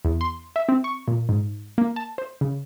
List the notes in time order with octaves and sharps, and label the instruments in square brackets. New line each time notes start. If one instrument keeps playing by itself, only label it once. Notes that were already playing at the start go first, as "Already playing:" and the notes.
[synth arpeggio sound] E2
C6
E5
C4
C#6
A#2
G#2
A#3
A5
C5
C#3